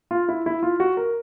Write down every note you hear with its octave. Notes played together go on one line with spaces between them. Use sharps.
F4
E4
E4
F4
F#4
A#4